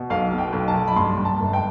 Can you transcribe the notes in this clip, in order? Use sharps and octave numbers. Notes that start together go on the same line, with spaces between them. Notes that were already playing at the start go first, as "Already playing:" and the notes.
Already playing: B2
B1 F5
B2
G5
B1
A5
B1
B5
G2 C6
G2
A5
G1
G5